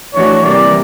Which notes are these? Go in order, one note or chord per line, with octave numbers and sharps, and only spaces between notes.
E3 A3 D4 F#4 C#5
C3 E3 G3 A#3 D5